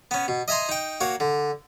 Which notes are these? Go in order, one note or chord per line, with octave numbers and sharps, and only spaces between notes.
B3 C#4
B2
D#5 E5 G#5 A#5 C6
D#4 G5
A#3 F#4 C#5
D3